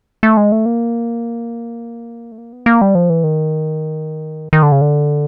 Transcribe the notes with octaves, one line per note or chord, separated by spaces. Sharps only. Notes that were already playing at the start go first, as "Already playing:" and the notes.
A3
G#3
A3
A#3
A3
A#3
B3
A#3
G3
F3
E3
D#3
D#3
D3
C#3
D3